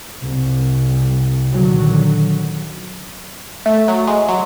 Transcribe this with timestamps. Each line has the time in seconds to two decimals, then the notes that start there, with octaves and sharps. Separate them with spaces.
0.23 C2
1.53 A#1 D3 D#3 F#3
3.66 A3
3.88 F#3
4.07 G#3
4.29 F#3